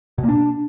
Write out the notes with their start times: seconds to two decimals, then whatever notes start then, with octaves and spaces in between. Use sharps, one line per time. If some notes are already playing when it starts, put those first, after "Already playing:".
0.18 B2
0.23 A#3
0.29 D4